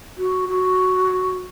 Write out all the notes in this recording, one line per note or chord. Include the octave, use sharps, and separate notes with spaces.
F#4
F#4